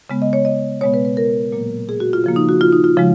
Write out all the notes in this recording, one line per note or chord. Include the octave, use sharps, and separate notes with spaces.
C#3 G#3 B3
D#5
C#5
D#5
B2 G#3 B3 C#5
B4
B4
A#4
A#2 F#3 A#3
G#4
F#4
F4
C#3 F3 A#3
D#4
F#4
F4
D#4
F4
C#3 F3 G#3